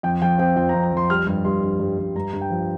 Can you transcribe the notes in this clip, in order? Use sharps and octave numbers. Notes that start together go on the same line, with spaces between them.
F2 G5
F3 G5
C4 G5
F2 G5
A#5
F2
A#5
F2 C6
G3 F6
G2 F6
G2 C6
G2
G2
G2
G2 A#5
G2
G5
F3